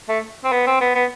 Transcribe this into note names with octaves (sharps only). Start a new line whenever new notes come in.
A3
C4
B3
C4
B3
B3